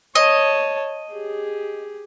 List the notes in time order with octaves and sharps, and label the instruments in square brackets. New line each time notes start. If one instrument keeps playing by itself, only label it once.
[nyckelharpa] C#5 A5 [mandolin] D#5
[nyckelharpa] G4 G#4